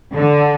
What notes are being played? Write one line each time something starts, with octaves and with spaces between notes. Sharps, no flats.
D3